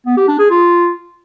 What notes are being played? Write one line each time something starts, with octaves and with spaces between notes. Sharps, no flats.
B3
G4
D4
G#4
F4